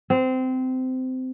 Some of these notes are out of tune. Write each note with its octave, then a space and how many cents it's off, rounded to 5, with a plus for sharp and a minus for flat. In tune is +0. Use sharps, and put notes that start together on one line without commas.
C4 -20